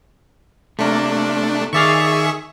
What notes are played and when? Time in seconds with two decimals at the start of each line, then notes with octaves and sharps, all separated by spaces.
0.79 C3 A3 A#3 D4
1.73 D#3 G#4 D5 E5 F5 C#6